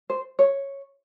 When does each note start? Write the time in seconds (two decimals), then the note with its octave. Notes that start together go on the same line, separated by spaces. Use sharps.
0.10 C5
0.39 C#5